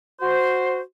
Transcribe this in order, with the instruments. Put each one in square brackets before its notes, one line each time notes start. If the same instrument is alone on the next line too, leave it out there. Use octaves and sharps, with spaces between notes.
[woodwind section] F#4 C5